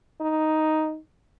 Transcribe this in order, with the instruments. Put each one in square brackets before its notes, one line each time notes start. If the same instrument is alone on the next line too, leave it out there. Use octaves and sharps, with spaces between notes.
[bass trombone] D#4